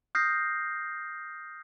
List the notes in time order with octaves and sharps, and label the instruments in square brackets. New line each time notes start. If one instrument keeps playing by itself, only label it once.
[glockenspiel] D#6 F6 G6 A#6 C7